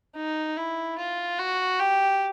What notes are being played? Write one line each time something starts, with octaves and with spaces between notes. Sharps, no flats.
D#4
E4
F4
F#4
G4